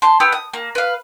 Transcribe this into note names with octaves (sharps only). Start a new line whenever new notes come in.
A5 C6
B3 G4 G#5 E6
D#6
A#3
B4 F5